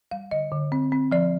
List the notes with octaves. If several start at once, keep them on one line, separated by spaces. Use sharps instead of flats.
G3 F5
D3 D#5
D3
C4
C4
F3 D5